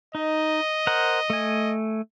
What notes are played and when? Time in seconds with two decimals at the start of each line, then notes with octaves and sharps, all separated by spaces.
0.15 D#4 D#5
0.87 A#4 C5 F#5
1.30 A3 G#5